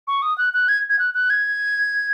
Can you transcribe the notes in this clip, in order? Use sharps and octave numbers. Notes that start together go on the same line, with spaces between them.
C#6
D#6
F#6
F#6
G#6
G#6
F#6
F#6
G#6